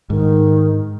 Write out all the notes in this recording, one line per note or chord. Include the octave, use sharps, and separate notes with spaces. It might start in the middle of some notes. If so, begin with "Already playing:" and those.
G#2 D#3